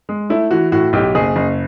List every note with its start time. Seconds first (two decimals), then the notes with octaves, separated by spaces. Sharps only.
0.09 G#3
0.30 A3 E4
0.51 E3 F#4
0.72 A2 F#4
0.93 B1 G4
1.15 F#1 G#4
1.36 F#1